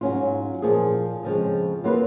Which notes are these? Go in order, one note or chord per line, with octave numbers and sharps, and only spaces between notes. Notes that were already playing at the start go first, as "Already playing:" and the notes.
G#2 F#3 C#4 F4
A#2 F3 A#3 F4 G#4
F2 C#3 F3 G#3
F#3 A#3 F4 B4